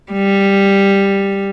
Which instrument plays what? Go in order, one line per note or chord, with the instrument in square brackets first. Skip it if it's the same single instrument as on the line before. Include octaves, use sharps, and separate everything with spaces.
[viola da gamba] G3